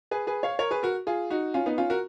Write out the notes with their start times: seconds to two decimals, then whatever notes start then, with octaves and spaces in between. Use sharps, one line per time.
0.11 G#4 B4
0.27 G#4 B4
0.43 C#5 F5
0.59 A#4 C#5
0.71 G#4 B4
0.83 F#4 A#4
1.07 F4 G#4
1.30 D#4 F#4
1.54 C#4 F4
1.66 B3 D#4
1.78 C#4 F4
1.90 F#4 A#4